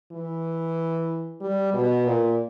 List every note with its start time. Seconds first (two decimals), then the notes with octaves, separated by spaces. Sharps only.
0.12 E3
1.41 G3
1.73 B2
2.05 A#2